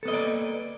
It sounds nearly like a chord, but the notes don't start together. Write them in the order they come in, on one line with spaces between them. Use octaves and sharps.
A4 B3 D#5 A#3 D5